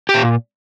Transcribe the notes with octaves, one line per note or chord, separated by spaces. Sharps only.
G4
A#2